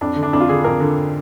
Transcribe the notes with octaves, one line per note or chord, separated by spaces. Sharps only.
F2 D4
D3
D4
F2 D4
F4
D3 G#4
F2 A#4
D3